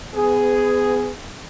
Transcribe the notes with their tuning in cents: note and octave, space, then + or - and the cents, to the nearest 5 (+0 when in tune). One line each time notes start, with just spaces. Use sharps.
B3 +30 G#4 +0 B4 +45